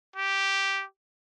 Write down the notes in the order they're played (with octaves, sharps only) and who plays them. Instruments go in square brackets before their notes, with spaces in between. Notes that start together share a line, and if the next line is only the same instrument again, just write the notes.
[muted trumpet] G4